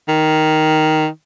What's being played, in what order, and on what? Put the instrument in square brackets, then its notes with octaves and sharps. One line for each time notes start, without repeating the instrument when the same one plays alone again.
[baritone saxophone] D#3